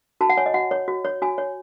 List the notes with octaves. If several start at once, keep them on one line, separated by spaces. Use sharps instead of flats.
F#4 A5
F#5
C#5 G#5
D#5
F#4 F#5
C#5
F#4
C#5
F#4 G#5
C#5